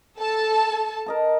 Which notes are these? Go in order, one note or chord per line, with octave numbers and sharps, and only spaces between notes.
A4 A5
A#4 D#5 A5